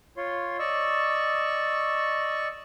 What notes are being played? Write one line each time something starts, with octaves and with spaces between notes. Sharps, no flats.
F4 C#5 C6
D5 D#5 C#6 E6